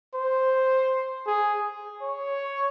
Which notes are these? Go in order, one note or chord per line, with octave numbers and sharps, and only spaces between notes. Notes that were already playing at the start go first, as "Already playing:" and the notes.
C5
G#4
C#5